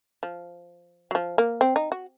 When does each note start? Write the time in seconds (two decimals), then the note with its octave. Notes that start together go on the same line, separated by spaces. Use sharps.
0.23 F3
1.11 F#3
1.15 F3
1.38 A#3
1.61 C4
1.76 D#4
1.92 F#4